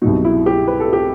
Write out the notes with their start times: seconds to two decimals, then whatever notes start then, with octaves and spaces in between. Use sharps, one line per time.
0.02 C2 B2 F#3 D#4
0.25 E4
0.46 G4
0.67 B4
0.80 A4
0.93 G4